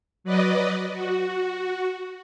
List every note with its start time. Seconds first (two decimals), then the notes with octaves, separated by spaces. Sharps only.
0.24 F#3 B4 D5 D#5
0.93 F#4